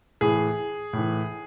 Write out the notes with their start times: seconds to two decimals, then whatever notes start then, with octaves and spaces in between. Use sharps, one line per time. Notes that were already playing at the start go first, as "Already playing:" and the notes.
0.21 A2 E3 G#4
0.93 A2 E3